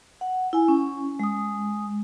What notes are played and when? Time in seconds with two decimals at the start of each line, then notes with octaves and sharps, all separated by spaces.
0.21 F#5
0.53 E4 G#5
0.68 C#4
1.20 G#3 D#6